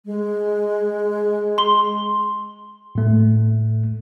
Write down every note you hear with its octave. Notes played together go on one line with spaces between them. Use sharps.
G#3
C6 G7
A2 A3